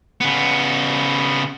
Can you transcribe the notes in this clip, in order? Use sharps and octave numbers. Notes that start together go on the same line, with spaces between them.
C#3 B3